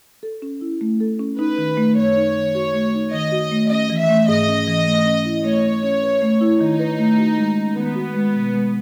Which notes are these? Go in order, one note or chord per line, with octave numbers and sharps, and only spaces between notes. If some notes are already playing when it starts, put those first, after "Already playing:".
A4
C#4
E4
A3
A4
C#4
D#4 B4
D#3
A3
F#2 C#5
D#4
D#3
F#4
A3
D#4
D#3 D#5
F#4
A3
C#4 D#5
E3
E5
A3
G#2 D#5
C#4
E3
A3
C#4
E4
A3 C#5
A3
C#4
B4
A3
E4
D#3 D#4
B4
A3
F#4
G#3
C#4
D#3 B3
F#4
G#3
B2
G#3